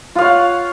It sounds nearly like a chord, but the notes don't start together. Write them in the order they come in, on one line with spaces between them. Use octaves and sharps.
F4 F5 C#5 F#5